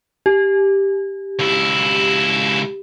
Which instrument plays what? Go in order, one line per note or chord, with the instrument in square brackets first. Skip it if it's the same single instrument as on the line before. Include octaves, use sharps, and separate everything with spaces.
[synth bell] G4
[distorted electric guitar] C#2 E4